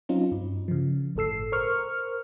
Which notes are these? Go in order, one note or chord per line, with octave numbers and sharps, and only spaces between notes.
F#3 C4 C#4 D#4 F4
G2
C#3 F3
G1 A2 A4 E6 C7
A#4 C5 C#6 F6